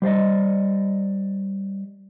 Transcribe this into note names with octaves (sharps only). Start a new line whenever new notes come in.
G3 C5 D5 D#5